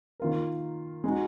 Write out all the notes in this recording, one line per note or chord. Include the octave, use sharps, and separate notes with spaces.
D#3 A#3 F4 A#4
G#3 D#4 F#4